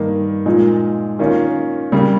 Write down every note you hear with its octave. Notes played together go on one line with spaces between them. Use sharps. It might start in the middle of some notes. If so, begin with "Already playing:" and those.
Already playing: G2 D#3 A#3
A#2 F3 G#3 D#4
D#3 A#3 C#4 F4
C#3 G3 A#3